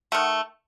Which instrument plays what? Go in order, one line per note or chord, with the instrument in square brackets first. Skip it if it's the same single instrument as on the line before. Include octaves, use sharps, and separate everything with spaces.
[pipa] D#3 A3 F#5